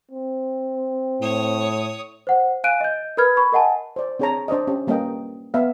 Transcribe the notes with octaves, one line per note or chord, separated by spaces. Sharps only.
C4
A2 C#5 D#6
C5 F#5
F5 G#5 F#6 D7 D#7
D#5 G6
A#4 B4 B5 F6 G#6
B5 C#6
A#4 D#5 F#5 G#5 A5
C5 D5
C4 D4 G#4 C#5 A5 A#5
D4 C5 D5 D#5
C#4 G4
G3 A#3 C#4 B4 D#5 G5
B3 E5 F5